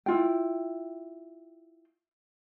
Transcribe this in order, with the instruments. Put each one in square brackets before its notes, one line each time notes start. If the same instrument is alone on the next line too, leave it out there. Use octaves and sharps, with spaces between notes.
[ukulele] E4 F4 G5